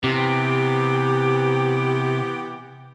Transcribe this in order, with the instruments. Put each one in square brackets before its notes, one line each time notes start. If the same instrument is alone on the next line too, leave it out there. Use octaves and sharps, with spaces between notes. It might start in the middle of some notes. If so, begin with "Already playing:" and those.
[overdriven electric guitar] C3 [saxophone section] E3 B3 G4